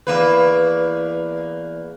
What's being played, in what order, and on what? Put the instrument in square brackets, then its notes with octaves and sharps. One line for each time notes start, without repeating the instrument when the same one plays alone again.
[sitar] E2 A#3 B4